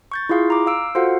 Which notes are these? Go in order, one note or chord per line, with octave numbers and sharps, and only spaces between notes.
C#6 G6 A6
E4 F4 G#4 F5 C6
A#5 D6
F5 E6 D7
F4 F#4 A4 C5 F5 F#5